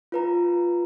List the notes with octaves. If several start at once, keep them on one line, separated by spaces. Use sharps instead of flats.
F4 B4 A#5